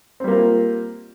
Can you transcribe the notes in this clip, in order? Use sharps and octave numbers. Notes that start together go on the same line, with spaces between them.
G3 A#3 C4 F4